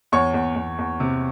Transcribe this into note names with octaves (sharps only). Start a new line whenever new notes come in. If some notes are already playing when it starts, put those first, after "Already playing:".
E2 C#5 C#6
E2
E2
E2
C3